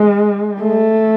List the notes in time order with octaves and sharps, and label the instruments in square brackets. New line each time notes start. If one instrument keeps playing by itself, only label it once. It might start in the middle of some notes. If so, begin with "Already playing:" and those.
Already playing: [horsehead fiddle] G#3
A3